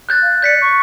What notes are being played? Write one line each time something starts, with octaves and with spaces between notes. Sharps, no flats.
F#6 G6 A6
F5
D5 G6 B6 C#7
C#6